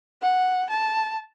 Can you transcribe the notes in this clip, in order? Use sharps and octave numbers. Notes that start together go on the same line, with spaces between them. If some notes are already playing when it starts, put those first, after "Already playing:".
F#5
A5